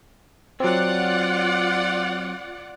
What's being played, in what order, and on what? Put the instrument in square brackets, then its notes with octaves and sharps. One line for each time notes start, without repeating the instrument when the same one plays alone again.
[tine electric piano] F#3 C4 [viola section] F4 D5 F#5